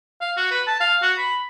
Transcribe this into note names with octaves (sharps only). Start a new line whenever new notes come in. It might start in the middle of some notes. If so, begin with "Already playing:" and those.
F5
F#4
B4
A5
F5
F#4
B5